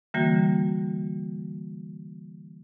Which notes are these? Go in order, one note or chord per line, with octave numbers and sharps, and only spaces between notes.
D3 E3 G3 A#3 F#4